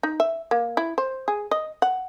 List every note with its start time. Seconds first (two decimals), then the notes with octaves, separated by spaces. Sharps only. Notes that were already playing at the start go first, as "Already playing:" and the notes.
0.03 D#4
0.20 E5
0.51 A#3
0.77 E4
0.98 C5
1.28 G#4
1.51 D#5
1.82 F#5